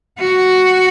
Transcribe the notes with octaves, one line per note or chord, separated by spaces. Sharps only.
F#4